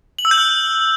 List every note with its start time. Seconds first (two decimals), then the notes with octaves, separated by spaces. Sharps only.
0.19 F#7
0.25 E6
0.31 G6
0.38 F6